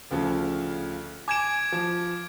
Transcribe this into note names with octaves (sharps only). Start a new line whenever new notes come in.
D2 C#3 F3
G#5 D6 G#6 D7 E7
F3